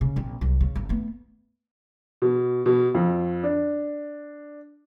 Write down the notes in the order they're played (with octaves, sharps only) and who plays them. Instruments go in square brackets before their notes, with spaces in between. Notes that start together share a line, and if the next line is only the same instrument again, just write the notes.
[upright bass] C#3 C#4
A#1 C4
C2 F#3
C#3
G1
A3 B3
[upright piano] B2
B2
F2
D4